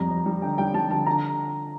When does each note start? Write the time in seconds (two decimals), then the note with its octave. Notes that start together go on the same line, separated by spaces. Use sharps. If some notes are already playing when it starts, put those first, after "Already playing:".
Already playing: F2 G3 A#5
0.10 F2
0.26 G3
0.42 D3 G5
0.58 G3 G5
0.74 G3 A5
0.90 D3 A5
1.06 D3 A#5